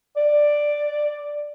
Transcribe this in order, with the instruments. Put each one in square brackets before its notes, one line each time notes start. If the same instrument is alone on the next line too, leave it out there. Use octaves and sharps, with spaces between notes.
[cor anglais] D5